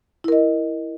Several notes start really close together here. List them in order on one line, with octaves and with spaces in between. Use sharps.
E4 A#4 D#5